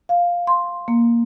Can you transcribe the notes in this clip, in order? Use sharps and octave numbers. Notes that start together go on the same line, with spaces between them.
F5
C6
A#3